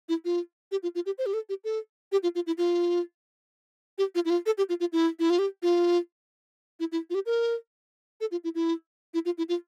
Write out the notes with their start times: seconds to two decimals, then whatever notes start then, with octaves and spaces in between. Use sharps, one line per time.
0.09 E4
0.25 F4
0.72 G4
0.83 F4
0.95 F4
1.06 G4
1.18 C5
1.26 G4
1.34 A4
1.49 G4
1.64 A4
2.12 G4
2.23 F4
2.35 F4
2.47 E4
2.58 F4
3.98 G4
4.15 F4
4.25 E4
4.30 F4
4.46 A4
4.58 G4
4.69 F4
4.80 F4
4.92 E4
5.19 E4
5.30 F4
5.39 G4
5.62 F4
6.80 E4
6.92 E4
7.10 F4
7.15 G4
7.26 A#4
8.21 A4
8.31 F4
8.44 E4
8.55 E4
9.14 E4
9.25 F4
9.38 E4
9.49 F4